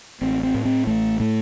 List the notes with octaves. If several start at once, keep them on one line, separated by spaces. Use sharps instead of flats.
A1 C4
C4
A2
C4
A1 A3
A2 A3